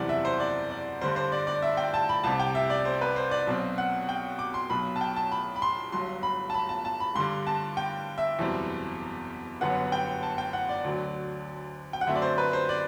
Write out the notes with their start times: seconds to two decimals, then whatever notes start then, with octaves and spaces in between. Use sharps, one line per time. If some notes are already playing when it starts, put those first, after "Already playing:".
Already playing: F#1 E2 C3 E3 G3 D5 F#5
0.09 E5
0.25 C5
0.40 D5
0.71 D5
1.01 G2 D3 G3 C5
1.16 C5
1.32 D5
1.47 D5
1.62 E5
1.77 G5
1.94 A5
2.09 B5
2.24 C2 C3 G3 A5
2.40 G5
2.55 E5
2.70 D5
2.85 C5
3.01 B4
3.16 C5
3.31 D5
3.47 B1 B2 F#3 C4
3.78 F#5
4.09 G5
4.39 D6
4.54 C6
4.70 B1 B2 F#3 B5
4.96 A5
5.01 G5
5.16 A5
5.32 B5
5.56 B5
5.62 C6
5.92 G1 G2 F#3 C6
6.23 B5
6.50 A5
6.54 B5
6.69 A5
6.85 A5
7.00 B5
7.15 G2 D3 G3 C6
7.47 A5
7.77 G5
8.18 E5
8.39 F#1 E2 B2 G3 C4
9.61 G1 F#2 D3 F#3 B3 F#5
9.92 G5
10.23 A5
10.38 G5
10.53 F#5
10.69 D5
10.84 D2 D3 F#3
11.93 G5
12.01 F#5
12.07 F#2 D3 F#3 A3 C4 E5
12.15 D5
12.22 C5
12.38 B4
12.53 C5
12.69 D5